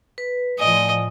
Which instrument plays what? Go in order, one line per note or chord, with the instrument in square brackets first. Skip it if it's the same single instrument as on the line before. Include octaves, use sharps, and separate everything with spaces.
[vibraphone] B4
[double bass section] A2 F3 [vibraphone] D5 G#5 [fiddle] D#5